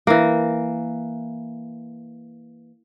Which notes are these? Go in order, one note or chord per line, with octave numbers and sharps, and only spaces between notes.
E3 A#3